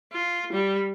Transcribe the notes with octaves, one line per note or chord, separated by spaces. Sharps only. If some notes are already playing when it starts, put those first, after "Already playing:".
F4
G3